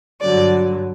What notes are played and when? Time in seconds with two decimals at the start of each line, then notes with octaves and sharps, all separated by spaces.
0.21 G2 D3 F#3 D5